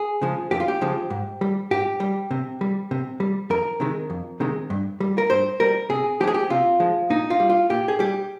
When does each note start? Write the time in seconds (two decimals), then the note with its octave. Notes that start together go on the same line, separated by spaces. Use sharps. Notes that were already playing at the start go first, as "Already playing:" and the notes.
Already playing: G#4
0.22 C#3 F3 G#3
0.51 F2 G4
0.60 F4
0.68 G4
0.81 C#3 F3 G#3
1.10 G#2
1.41 G3
1.71 G#2 G4
2.00 G3
2.31 C3
2.61 G3
2.91 C3
3.20 G3
3.50 F2 A#4
3.80 C3 D#3 G#3
4.10 F2
4.40 C3 D#3 G#3
4.70 G2
5.00 G3
5.18 A#4
5.30 G2 C5
5.60 G3 A#4
5.90 C3 G#4
6.20 F3 G4
6.24 G#3 G#4
6.34 G4
6.50 C3 F4
6.80 F3 G#3
7.10 A#2 D#4
7.30 F4
7.40 G3
7.50 F4
7.70 A#2 G4
7.88 G#4
7.99 G3 G4